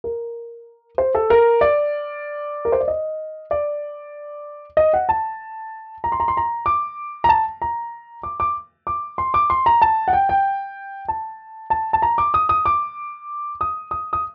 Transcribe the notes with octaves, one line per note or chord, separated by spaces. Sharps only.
A#4
C5
A4
A#4
D5
A#4
C5
D5
D#5
D5
D#5
F#5
A5
A#5
C6
A#5
C6
A#5
D6
A#5
A5
A#5
D6
D6
D6
C6
D6
C6
A#5
A5
F#5
G5
G5
A5
A5
A5
A#5
D6
D#6
D#6
D6
D#6
D#6
D#6